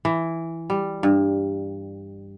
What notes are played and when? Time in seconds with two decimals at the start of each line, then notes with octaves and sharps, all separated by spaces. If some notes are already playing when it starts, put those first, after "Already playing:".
0.05 E3
0.70 G3
1.03 G2